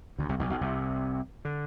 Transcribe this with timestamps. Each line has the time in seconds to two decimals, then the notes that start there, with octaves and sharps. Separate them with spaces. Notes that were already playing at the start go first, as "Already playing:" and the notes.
0.18 D2 D3
0.29 C2 C3
0.39 B1 B2
0.50 B1 B2
0.61 C2 C3
1.45 D3